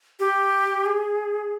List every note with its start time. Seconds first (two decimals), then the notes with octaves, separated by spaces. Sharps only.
0.20 G4
0.86 G#4